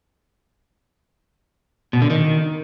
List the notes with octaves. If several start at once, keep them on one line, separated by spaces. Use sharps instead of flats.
B2
D3
D#3